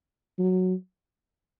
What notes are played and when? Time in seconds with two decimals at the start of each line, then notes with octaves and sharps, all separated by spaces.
0.39 F#3